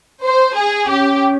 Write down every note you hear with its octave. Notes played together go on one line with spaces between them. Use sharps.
C5
G#4
C#4 G4